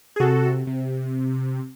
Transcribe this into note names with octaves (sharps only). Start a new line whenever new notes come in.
G#4
C3 F#4 A4
C3